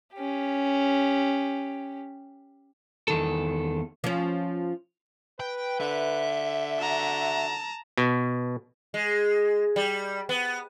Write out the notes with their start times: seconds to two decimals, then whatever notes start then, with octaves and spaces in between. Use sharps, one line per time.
0.14 C#4 G4
3.08 E2 D#3 A4
4.04 F3 C#4
5.40 B4 G5
5.80 D3 E5
6.79 F#4 A5 A#5
7.98 B2
8.94 G#3
9.76 G3
10.29 B3